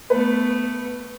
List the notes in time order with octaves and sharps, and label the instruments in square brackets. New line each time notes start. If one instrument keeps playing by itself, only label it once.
[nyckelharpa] A3 B3 [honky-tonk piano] B4